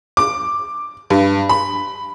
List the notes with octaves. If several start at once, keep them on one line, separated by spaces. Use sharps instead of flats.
D6
G2
B5